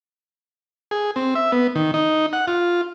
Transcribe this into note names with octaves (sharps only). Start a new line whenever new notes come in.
G#4
C4
E5
B3
D#3
D#4
F#5
F4